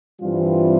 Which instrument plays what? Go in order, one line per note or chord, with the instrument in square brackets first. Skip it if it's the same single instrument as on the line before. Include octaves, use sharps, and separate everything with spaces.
[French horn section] G2 E3 G3 C4 F4